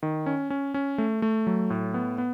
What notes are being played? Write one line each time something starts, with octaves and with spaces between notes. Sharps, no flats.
D#3
C#4
C#4
C#4
A3
A3
F#3
A2
B3
B3